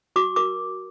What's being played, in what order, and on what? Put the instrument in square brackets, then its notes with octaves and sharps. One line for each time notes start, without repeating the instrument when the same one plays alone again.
[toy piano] F#4 D6
A#4 D6